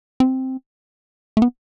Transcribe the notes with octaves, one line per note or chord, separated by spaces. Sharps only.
C4
A3
B3